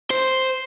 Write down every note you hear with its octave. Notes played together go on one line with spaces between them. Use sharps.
C5